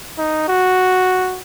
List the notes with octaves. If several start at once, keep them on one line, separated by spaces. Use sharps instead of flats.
D#4
F#4